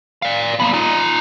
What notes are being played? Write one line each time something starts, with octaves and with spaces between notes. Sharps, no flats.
D5 F5
A#3 B3
D#4 F4